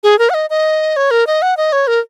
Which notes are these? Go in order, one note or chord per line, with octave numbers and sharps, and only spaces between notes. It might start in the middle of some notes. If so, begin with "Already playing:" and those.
G#4
A#4
F#5
D#5
D#5
C#5
A#4
D#5
F#5
D#5
C#5
A#4